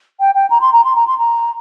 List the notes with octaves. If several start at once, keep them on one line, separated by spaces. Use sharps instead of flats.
G5
G5
A#5
C6
A#5
C6
A#5
C6
A#5